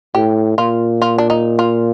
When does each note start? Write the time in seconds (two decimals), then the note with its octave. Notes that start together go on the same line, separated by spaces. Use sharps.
0.14 A2 G4
0.58 A#2 F4
1.02 F4
1.18 D4
1.30 D#4
1.59 F4